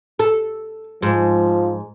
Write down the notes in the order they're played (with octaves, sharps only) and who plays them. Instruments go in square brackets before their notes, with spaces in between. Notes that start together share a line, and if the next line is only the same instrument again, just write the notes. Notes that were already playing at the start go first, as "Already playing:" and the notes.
[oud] A4
[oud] G#2 [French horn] F3